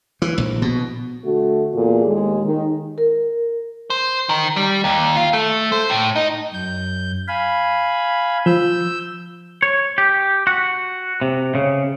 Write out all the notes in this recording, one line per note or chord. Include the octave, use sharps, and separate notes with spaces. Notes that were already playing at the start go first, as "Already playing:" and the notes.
E3
A#1
B2
D3 A3 F#4
E2 A#2 G#4 A4
D#2 G#3
D#3 A#4
A#4
C5
D#3
G3
D#2
F4
A3
C5
A2
D#4
F#2 G6
F5 G#5 B5
F3 E6 G6
C#5
G4
F#4
C3
C#3